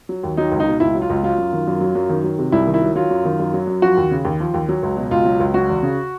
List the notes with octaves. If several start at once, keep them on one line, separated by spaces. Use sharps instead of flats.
F#3
D#2
F#3 D#4
C#2
D#4
B2
C#2 E4
F#3
F4
C#2
F#3 F4
F#2
D#3
F#2
F#3
F#2
D#3
F#3
C3
C2 E4
D#3
E4
F#3
F#3 F4
F#2
D#3
F#2
F#3
F#2
F3 F#4
D#2
C#3
D#2
F3
D#2
F#3
C#2
B2
C#2 F4
F#3
C#2
F#3 F#4
E2
C#3